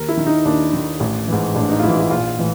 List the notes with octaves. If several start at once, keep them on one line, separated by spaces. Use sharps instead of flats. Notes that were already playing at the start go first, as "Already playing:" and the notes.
Already playing: D#2 A#4
E4
D#3
D#4
D#2 D4
D#3
A1
G#2 E3
A1 D4
D#4
F4
G#2 E3 E4
E4
A#1 F4
A2 E3